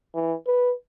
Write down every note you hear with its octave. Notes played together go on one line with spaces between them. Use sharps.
E3
B4